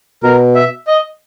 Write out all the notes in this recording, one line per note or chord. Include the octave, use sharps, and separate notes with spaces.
B2 A#4
E5
D#5